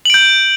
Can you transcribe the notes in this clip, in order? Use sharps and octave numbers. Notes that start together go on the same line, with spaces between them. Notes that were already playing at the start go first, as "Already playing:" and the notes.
G6 D7 F#7